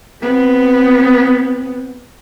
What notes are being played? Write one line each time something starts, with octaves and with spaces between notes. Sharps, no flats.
B3 C4